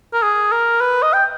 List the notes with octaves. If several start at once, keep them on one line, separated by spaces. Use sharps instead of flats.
A#4
G#4
A#4
B4
D#5
G5